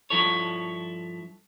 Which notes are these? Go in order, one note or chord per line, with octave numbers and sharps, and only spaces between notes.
G2 F3 E4 A4 C#5